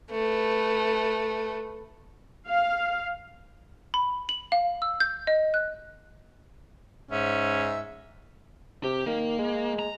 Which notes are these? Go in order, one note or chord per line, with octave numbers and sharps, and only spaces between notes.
A3 B4
F5
B5
F#7
F5
E6
G6
D#5
F#6
G#2 C#4 E5
C3 G4
D#3 A#3
G#3
A#5